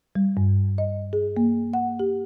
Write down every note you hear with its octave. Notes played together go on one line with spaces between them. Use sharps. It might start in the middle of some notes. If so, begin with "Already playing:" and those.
G3
G2
D#5
G#4
A#3
F#5
G4